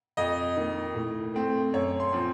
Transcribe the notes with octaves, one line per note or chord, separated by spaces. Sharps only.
F2 D#5
D#3 A#3
A2
A3 C4
F#2 C#5
C6
F3 C4